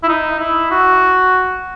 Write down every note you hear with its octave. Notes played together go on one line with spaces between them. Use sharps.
E4
D#4
E4
F#4